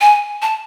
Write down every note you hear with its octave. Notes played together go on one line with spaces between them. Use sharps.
G#5
A5